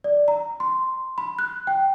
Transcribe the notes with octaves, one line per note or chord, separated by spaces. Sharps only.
D5
A#5
C6
B5
F#6
G5